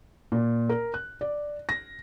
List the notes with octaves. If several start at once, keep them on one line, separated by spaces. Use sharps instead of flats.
A#2
A#4
F#6
D5
A#6